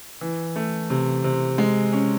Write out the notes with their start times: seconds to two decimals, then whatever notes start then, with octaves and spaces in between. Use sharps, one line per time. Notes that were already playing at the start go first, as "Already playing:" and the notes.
0.21 E3
0.56 A3
0.90 C3
1.24 C3
1.58 G#3
1.93 C#4